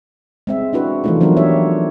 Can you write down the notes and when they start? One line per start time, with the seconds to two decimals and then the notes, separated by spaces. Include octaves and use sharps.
0.47 G#3 C4 E5
0.73 D4 E4 F#4 B4
1.04 E3 F3 G3 A3 D#4 F4
1.21 F3 F#3 B3 D4 F#4 A#4
1.37 D4 F#4 G4 C#5 E5